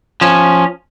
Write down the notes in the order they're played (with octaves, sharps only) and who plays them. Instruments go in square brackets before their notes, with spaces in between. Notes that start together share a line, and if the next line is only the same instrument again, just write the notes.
[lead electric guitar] F3 C#4